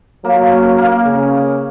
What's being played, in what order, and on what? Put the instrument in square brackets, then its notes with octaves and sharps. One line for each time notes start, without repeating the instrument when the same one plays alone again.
[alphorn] F#3 [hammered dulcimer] A#3
[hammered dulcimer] C#4
A#3
[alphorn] C#3